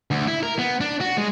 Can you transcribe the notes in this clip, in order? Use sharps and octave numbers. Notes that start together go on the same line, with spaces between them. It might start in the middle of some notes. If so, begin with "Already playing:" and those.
D2
E4
A#4
B3
D4
F#4
G#3